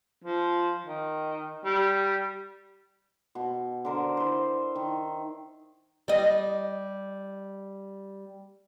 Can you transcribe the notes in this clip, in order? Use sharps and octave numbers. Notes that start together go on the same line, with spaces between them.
F3
D#3
G3
B2
D3 A#4 C5
E4 C5
D#3
G3 D#5